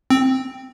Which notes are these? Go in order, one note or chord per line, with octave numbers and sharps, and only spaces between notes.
C4